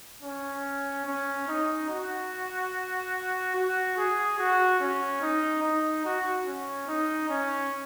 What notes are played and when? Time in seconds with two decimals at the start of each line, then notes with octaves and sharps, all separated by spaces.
0.23 C#4
1.06 C#4
1.48 D#4
1.90 F#4
3.56 F#4
3.97 G#4
4.39 F#4
4.80 C#4
5.21 D#4
5.63 D#4
6.05 F#4
6.46 C#4
6.88 D#4
7.29 C#4